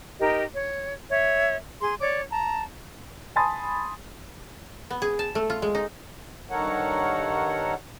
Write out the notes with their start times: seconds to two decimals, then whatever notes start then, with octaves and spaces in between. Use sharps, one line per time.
0.20 D#4 G4 A#4 D#5
0.54 C#5
1.10 C#5 E5
1.81 G#4 C6
2.01 C#5 D5 D6
2.30 A5 A#5
3.36 G#5 A5 B5 C6 D#6 A6
4.90 B3
5.02 G#4
5.19 A5
5.35 A3
5.50 F4
5.62 G#3
5.75 D#4
6.50 G2 D#3 A4 A#4 C#5 F#5